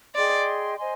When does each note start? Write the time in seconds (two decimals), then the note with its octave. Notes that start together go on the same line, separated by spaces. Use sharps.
0.15 G#4 D5 D#5 G5 C6
0.77 C5 D#5 G#5 C6